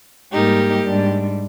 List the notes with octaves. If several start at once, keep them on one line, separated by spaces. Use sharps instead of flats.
G#2 G3 A#3 D#4 G4
G#2 G3 D4